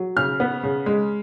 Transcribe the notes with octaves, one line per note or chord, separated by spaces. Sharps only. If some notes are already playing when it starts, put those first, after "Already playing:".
Already playing: F#3
C#3 F6
B3
C#3
G#3